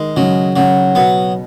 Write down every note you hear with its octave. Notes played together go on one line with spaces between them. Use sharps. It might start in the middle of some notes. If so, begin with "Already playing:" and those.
Already playing: D#3 G#3
C#3 F#3
C#3 F#3
B2 B3